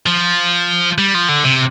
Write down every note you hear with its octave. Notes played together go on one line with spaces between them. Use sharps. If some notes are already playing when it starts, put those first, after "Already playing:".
F3
G3
F3
D3
C3